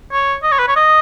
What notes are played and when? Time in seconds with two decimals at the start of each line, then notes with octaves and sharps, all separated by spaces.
0.12 C#5
0.43 D#5
0.52 C#5
0.59 B4
0.68 C#5
0.76 D#5